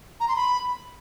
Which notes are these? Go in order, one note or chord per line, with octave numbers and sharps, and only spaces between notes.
A#5
C6
B5